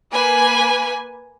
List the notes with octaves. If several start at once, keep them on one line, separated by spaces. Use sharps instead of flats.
A#3 B4 G#5